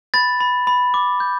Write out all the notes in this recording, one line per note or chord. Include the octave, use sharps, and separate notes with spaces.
B5 A6
B5
B5
D6
G6